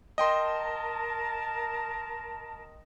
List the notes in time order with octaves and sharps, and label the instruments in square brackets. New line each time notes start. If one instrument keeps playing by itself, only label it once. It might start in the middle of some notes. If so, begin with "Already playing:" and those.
[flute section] A#4 A5 [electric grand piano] D#5 G5 C6